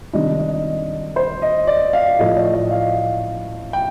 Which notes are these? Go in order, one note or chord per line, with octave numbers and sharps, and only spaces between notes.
C3 D#3 G3 D4 D#5
D#5
C5
D#5
D5
F5
A2 F3 A3 D#5
D5
D#5
F5
G5